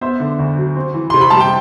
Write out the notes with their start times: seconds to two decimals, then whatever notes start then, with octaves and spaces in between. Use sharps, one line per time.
0.01 B3 C5 E5
0.20 D3
0.39 D2
0.57 F#3
0.76 C4
0.94 E3
1.10 C3 C6
1.21 B5
1.30 G3 A5
1.40 G5